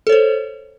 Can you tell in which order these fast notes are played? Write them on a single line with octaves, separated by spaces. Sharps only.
A4 C#5 C5